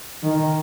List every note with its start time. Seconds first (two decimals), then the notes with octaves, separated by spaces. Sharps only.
0.23 D#3